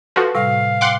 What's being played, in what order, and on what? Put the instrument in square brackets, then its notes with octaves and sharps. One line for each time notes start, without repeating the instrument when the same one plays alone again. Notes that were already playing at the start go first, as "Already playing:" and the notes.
[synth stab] F3 F#4 [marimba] A4 B4
[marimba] A2 C3 G3 [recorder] F5
[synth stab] F#5 C6 D6 [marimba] G5